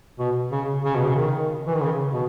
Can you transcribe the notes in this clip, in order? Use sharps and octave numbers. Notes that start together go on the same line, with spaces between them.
B2
C#3
C#3
B2
C#3
D#3
E3
D#3
C#3
B2